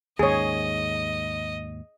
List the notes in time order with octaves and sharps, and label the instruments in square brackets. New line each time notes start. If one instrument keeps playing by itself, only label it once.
[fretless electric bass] D#2 G#2 [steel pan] G#4 C#5 [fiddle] D#5